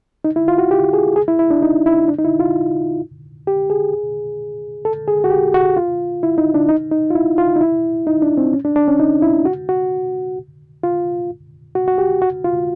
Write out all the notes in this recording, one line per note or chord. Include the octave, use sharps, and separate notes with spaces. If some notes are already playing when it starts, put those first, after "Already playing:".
D#4
E4
F4
F#4
G4
G#4
G#4
E4
E4
D4
D#4
E4
D4
D#4
E4
F4
G4
G#4
A4
G#4
F#4
G4
F#4
F4
E4
D#4
D4
D#4
D#4
F4
E4
F4
D#4
E4
D#4
D4
C4
C#4
D4
D4
C#4
D#4
E4
F#4
F#4
F4
F#4
F#4
G4
F#4
F4